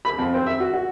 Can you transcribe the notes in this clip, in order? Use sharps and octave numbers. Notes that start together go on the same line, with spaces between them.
B5
F2
C4
E5
F#4
F#4